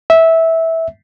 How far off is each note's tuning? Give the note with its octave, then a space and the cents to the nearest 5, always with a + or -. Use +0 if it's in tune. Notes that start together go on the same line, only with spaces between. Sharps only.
E5 -15